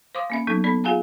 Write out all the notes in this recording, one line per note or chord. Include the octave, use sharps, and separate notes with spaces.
C5 F5 C6 D6 D#6
A#3 C#4 E5
F#3 B3 D#4 A4
B3 A4 D5 B5
F4 G#4 F5 F#5 G#5 A#5